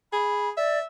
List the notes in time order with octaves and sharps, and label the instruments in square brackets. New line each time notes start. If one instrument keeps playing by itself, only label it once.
[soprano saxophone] G#4 [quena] B5
[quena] D5 [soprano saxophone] E5